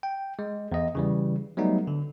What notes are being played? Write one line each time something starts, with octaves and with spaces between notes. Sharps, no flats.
G5
G#3
E2 D#5
C#3 E3 G3
F#3 G3 A3 B3 D#4
D3